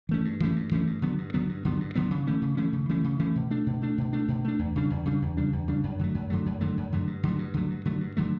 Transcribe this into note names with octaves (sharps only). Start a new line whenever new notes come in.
E3 A3 C#4
G2
E3 A3 C#4
G2
E3 A3 C#4
G2
D3 F#3 B3
G2
D3 F#3 B3
G2
D3 F#3 B3
G2
D3 F#3 B3
C#3
E3 A3 C#4
C#3
E3 A3 C#4
C#3
E3 A3 C#4
C#3
E3 A3 C#4
B2
A3 D4
B2
A3 D4
B2
A3 D4
B2
A3 D4
E2
C#3 G3 D4
E2
C#3 G3 D4
E2
C#3 G3 D4
E2
C#3 G3 D4
F#2
D3 F#3 A3
F#2
D3 F#3 A3
F#2
D3 F#3 A3
F#2
D3 F#3 A3
G2
D3 F#3 A3
G2
D3 F#3 A3
G2
D3 F#3 A3
G2
D3 F#3 A3